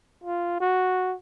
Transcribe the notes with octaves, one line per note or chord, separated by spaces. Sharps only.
F4
F#4